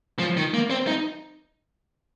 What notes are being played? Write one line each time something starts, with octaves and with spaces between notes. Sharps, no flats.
F3
D#3
A#3
C4
D#4